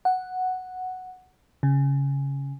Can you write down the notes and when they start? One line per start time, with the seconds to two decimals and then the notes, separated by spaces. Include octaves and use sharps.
0.05 F#5
1.63 C#3